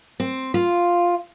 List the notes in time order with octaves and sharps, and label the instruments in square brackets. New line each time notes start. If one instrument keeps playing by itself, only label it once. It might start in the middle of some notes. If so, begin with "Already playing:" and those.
[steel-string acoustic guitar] C4
F4